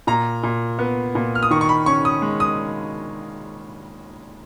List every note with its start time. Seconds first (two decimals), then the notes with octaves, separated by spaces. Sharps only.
0.07 A#2 A#5
0.43 A#2
0.79 B3
1.15 A#2
1.35 F6
1.43 D#6
1.51 D#3 C#6
1.61 C#6
1.69 B5
1.86 C#4 C#6
2.05 D#6
2.22 G#3
2.40 D#6